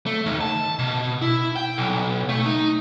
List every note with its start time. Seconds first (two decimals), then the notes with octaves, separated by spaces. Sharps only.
0.06 A3
0.26 D#2
0.41 A5
0.79 B2
1.22 E4
1.56 G5
1.78 B1
2.29 A3
2.45 D#4